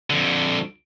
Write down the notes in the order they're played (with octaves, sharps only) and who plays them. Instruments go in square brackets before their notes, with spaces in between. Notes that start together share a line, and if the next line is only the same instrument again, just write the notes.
[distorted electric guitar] F2 D3